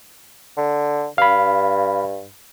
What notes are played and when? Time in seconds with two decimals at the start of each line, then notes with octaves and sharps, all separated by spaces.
0.57 D3
1.18 G2 F5 B5